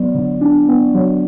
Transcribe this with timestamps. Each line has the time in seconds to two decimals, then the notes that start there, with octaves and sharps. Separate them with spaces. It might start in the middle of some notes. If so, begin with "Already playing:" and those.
Already playing: F#3 B3 D5
0.15 D3
0.41 D4
0.68 B3
0.94 F#3